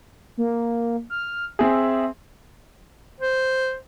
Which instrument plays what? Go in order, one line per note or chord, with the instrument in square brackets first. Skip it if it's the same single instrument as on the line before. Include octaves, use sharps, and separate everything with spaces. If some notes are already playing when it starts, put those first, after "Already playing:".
[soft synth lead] A#3
F6
[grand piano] C4 G#4 [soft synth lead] E5
[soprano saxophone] C5